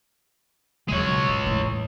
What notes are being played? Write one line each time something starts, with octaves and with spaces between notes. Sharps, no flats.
B1 E2 G#3 C#5
G#2
E2 A2